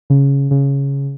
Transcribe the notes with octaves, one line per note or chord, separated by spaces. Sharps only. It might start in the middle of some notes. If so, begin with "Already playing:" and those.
C#3
C#3